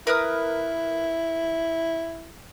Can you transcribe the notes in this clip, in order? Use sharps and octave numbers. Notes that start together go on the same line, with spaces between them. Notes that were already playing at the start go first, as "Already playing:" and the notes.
E4 A#4 B4 D#6